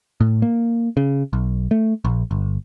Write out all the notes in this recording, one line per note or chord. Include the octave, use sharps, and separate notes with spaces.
A2
A#3
C#3
B1
A3
A#1
G1